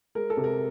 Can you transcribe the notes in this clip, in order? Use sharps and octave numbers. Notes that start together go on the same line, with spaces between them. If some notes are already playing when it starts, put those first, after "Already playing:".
G#3 A#4
A4
C3
A#4